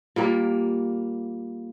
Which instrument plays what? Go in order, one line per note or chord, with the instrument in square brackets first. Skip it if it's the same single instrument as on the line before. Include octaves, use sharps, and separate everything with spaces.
[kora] A#2 G3 A#3